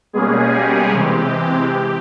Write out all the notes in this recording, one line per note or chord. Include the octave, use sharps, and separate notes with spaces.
B2 G3 G#3 A#3 C#4 G#4
G4
C3 E3 G#3 C4
G4